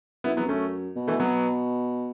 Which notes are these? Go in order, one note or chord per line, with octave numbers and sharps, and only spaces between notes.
F#2 B3 E4
E2 F#3 B3
F#2 A3 C#4
B2
E3 A3
F#3 B3